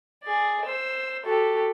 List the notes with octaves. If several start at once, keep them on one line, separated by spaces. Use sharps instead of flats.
G#4 D5
C5 E6
F#4 G4 A4